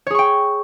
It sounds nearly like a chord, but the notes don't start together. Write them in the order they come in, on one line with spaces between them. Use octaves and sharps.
C#5 G#4 C#6 G5